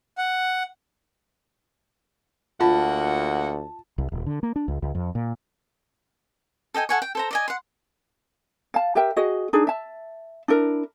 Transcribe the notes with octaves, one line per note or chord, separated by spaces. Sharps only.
F#5
D2 A#3 F4 F#5 A5
C2
D#1
D3
A#3
D4
C#2
C#2
F2
A#2
A4 D#5 G5 G#5
A4 F#5 G#5 C#6
G5
A4 C5 A#5
D5 D#5 G#5
F#5 C6
F5 A5
G4 A#4 E5 G5
F#4 G#4 D#5
D4 D#4 G#4
E5 A5
D4 E4 A#4